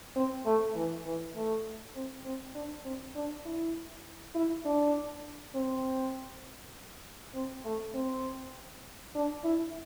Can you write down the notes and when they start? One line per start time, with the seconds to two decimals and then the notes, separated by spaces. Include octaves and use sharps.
0.16 C4
0.46 A3
0.76 E3
1.06 E3
1.35 A3
1.95 C4
2.25 C4
2.55 D4
2.85 C4
3.15 D4
3.45 E4
4.35 E4
4.65 D4
5.55 C4
7.35 C4
7.65 A3
7.95 C4
9.15 D4
9.44 E4